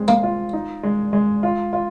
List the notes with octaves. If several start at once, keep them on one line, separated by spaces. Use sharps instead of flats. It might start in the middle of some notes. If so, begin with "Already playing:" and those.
Already playing: G#3 C4
A#3
F4
D#4
G#3
G#3
F4
F4